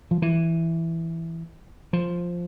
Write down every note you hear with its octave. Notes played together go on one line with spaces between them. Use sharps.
F3
E3
F3